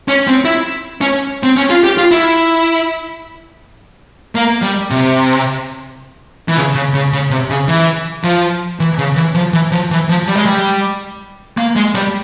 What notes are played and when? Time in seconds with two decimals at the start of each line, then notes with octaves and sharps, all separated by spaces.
0.08 C#4
0.27 C4
0.45 E4
1.01 C#4
1.43 C4
1.57 C#4
1.70 F4
1.84 G4
1.98 F4
2.11 E4
4.35 A#3
4.62 G3
4.91 C3
6.48 E3
6.57 C#3
6.75 C#3
6.94 C#3
7.12 C#3
7.30 C3
7.50 C#3
7.68 E3
8.24 F3
8.80 E3
8.98 C#3
9.16 E3
9.34 F3
9.53 E3
9.72 F3
9.91 E3
10.09 F3
10.28 G3
10.36 G#3
10.46 G3
11.58 A#3
11.76 G#3
11.95 G3